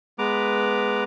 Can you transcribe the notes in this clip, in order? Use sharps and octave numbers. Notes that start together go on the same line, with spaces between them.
G#3 B3 B4 A#5 D6